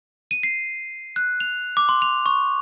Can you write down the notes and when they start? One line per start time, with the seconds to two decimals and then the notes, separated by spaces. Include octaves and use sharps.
0.31 D#7
0.43 C7
1.16 F#6
1.40 F7
1.77 D6
1.89 C6
2.02 F7
2.26 C#6